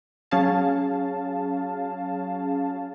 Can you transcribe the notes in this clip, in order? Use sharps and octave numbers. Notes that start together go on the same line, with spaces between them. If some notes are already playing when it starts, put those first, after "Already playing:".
F#3 C#4 G#4 F5 A5